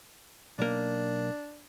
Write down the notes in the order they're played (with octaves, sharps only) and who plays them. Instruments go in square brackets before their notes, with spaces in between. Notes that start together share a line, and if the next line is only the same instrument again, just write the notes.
[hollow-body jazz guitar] B1 A#3 [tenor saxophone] D4